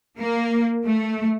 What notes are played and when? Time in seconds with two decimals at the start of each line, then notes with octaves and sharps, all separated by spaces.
0.17 A#3
0.84 A3